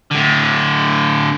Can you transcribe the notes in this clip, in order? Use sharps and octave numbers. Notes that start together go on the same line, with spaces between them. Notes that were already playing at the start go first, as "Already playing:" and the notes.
A2 D3